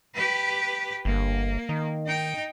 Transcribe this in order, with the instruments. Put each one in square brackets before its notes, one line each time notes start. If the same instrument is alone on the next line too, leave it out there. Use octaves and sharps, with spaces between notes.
[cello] G4 B4
[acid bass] G1 [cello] A#3
[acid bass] D#3
[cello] D#4 G5